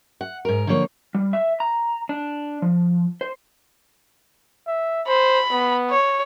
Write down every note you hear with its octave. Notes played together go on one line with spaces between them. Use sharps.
F#5
G#2 A#4
D3 F3 A#3 C#5
G3
E5
A#5
D4
F3
C5
E5
C5 B5
B3
C#5